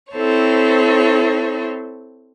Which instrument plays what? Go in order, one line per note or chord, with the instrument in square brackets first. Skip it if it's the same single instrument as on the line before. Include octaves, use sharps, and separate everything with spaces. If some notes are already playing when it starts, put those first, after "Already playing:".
[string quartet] C4 E4 A4 C5 C#5